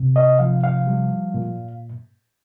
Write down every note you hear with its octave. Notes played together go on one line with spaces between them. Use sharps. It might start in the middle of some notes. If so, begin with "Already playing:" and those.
Already playing: C3
D#5
F3 F5
F5
G3
A#2